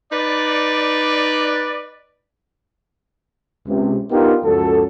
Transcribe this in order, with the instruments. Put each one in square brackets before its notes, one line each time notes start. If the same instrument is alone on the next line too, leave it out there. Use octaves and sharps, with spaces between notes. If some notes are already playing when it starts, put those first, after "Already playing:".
[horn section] D#4 B4 D5
[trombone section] C#2 C3
B3 D4 D#4 F4 G4 A#4
C#2 F#2 F3 F#3 A4